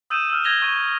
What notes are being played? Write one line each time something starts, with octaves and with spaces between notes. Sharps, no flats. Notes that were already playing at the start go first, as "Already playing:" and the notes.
D#6 E6 G6 D#7 E7
E6 F6
G6 G#6 A#6 F7 G7
C#6 G#6 D#7